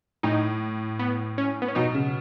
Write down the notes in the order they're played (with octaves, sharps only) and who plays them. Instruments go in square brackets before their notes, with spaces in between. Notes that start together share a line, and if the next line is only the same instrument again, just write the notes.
[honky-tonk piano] A2 [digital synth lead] D#4
[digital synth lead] B3
C#4
B3
C#4
[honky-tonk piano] B2 [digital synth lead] D#4
[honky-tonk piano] C#3